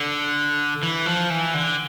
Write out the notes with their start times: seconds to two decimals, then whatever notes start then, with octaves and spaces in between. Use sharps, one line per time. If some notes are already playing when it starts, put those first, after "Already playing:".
Already playing: D3
0.83 E3
1.06 F3
1.30 E3
1.54 D3